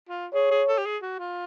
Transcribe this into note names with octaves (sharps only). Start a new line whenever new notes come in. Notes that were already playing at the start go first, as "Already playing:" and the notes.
F4
G#4 C#5
G#4
A4
G4
G#4
F#4
F4